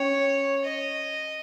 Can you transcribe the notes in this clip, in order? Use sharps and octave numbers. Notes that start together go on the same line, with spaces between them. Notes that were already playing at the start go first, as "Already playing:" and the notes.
Already playing: C#4 C#5
D#5